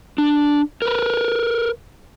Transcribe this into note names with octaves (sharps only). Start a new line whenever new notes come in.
D4
A#4 B4